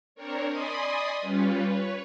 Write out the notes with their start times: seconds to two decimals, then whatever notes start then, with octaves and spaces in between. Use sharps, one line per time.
0.15 C4 D4 A#4 C#5
0.49 D5 D#5 G#5 B5 C6 D#6
1.21 G3 C#4 F4 B4
1.64 B4 C#5